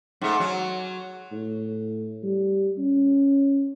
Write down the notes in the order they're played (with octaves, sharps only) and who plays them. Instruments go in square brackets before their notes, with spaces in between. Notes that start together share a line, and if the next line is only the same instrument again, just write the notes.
[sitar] G#2 A3
F#3
[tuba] A2
G3
C#4